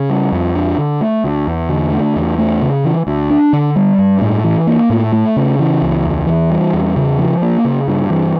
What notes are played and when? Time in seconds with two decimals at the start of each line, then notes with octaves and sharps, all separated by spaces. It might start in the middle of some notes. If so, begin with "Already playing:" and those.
Already playing: C#3
0.10 G3
0.32 F2
0.55 D4
0.78 D3
1.01 A3
1.24 D2
1.47 E2
1.69 D3
1.92 A3
2.16 E2
2.38 A3
2.62 C#3
2.84 E3
3.07 D2
3.30 D4
3.53 D3
3.76 G3
3.98 G2
4.22 A2
4.44 E3
4.67 A#3
4.90 A2
5.12 A3
5.36 C#3
5.59 E3
5.82 C#2
6.04 E2
6.27 E3
6.50 G3
6.73 E2
6.96 C#3
7.19 F3
7.42 A#3
7.65 C#3
7.88 G2
8.10 E3